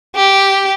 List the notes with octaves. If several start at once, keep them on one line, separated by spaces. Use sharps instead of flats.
G4